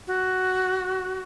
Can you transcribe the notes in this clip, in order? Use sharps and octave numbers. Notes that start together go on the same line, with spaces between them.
F#4